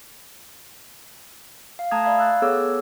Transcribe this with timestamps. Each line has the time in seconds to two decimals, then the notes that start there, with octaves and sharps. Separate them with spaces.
1.79 F5
1.91 A3 A5 A#5 D#6 G#6
2.04 D5 E5 F5 B5 G#6
2.19 E6 F#6 A6
2.42 B3 G#4 A4 C#5 D6 E6